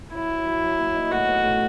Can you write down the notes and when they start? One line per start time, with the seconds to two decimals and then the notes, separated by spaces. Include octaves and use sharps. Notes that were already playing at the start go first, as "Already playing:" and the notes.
0.14 F#3 E4
0.30 F#3
0.47 F#3
0.63 F#3
0.79 A#3
0.95 D#4
1.11 A2 F#4
1.28 B3
1.44 A2